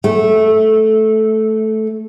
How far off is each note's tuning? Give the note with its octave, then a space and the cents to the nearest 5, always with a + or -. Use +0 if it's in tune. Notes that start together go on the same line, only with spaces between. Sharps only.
A3 -10